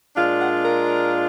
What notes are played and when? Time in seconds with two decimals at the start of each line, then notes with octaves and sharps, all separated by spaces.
0.16 A#2 G#3 D4 F4 F5
0.40 F#5
0.64 A#4